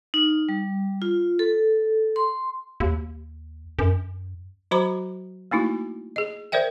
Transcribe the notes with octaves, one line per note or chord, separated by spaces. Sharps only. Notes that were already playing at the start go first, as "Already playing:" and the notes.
D#4
G3
F4
A4
C6
D#2
F#2
F#3 F#4 C5 A#5 B5 D6
A3 A#3 D#4 E4 F#4
G#4 D#5
A#4 C5 D5 E5 G5